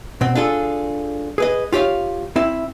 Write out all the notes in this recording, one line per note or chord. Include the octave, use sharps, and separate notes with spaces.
B2 C4
D4 F4 G#4 A4
G#4 B4 D#5
F4 G4 C#5 D#5 F5
C4 E4 E5